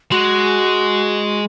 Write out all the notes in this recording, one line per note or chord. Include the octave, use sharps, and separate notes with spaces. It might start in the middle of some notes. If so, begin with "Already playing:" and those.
G#3 F#4